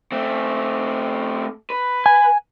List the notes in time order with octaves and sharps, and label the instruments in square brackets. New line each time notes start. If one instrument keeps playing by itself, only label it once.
[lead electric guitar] A3 C4
B4
[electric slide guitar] G#5